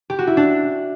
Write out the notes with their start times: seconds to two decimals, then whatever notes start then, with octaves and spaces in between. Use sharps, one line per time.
0.10 G4
0.19 F#4
0.27 E4
0.37 D4